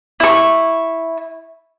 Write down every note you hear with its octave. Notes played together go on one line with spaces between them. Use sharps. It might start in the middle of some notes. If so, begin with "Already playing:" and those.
E4 C#6